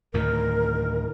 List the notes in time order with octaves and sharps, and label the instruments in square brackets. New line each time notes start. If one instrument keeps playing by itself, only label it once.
[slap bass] D2 A2 D#3 [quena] A#4